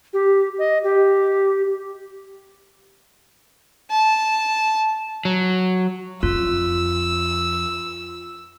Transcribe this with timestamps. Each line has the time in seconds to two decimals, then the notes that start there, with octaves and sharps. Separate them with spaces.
0.13 G4
0.59 D#5
0.83 G4
3.90 A5
5.25 F#3
6.23 F2 F4 E6